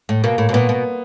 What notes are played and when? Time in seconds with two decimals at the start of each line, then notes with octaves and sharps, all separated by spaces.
0.09 A2
0.24 B2 A#3
0.38 A2
0.49 B2
0.53 A#2 B3
0.69 B2